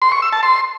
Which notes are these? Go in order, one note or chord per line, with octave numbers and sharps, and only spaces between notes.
C6
C#6
E6
A5
C6